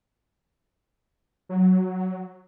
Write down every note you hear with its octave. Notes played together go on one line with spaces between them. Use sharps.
F#3